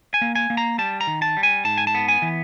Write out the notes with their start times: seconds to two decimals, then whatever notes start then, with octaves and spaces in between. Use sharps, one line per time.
0.14 G#5
0.22 A#3
0.35 G#5
0.50 A#3
0.57 A#5
0.78 G3 A5
1.01 A#5
1.07 D#3
1.22 A5
1.37 G3
1.43 G#5
1.65 G#2 A5
1.78 G#5
1.87 A5
1.95 B3
2.08 G#5
2.22 E3